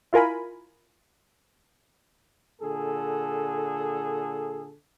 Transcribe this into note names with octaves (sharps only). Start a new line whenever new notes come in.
E4 F4 A#4 G#5 B5
A#2 D3 G#4 A4